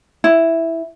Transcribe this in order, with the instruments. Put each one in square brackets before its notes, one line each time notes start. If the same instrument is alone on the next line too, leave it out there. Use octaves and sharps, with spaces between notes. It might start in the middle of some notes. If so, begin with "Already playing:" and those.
[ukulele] E4